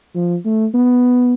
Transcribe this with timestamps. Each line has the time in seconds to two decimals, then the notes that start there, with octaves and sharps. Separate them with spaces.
0.15 F3
0.45 A3
0.74 B3